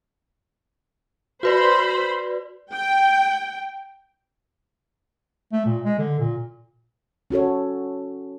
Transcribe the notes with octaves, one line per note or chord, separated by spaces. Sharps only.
F#4 B4 C5 D5 B5 C6
G5
A3
A#2
G#3
D3
A#2
C#4 F#4 A4 C#5